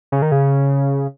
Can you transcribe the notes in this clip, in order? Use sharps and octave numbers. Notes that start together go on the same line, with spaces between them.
C#3
D#3
C#3